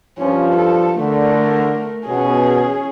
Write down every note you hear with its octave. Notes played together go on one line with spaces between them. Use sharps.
G2 F3 C#4
A4
D3 A3 A#4
B2 C#4 G#4